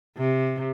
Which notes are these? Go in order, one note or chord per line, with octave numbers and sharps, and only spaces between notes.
C3